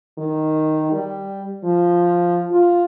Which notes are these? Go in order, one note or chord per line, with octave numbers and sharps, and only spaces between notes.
D#3
G3
F3
F4